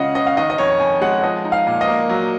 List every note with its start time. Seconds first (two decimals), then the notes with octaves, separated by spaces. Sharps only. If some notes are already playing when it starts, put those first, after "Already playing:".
Already playing: C#3 G#3 F4 D#5 F5 F#5
0.15 C#4 D#5
0.26 F5
0.37 D#3 D#5
0.50 D#5
0.58 F2 C#5
0.80 F2 G#5
1.01 G#3 F#5
1.23 F3 D#5
1.45 D#4
1.52 F5
1.67 A#2
1.81 D#5
1.88 A#3
2.09 F#3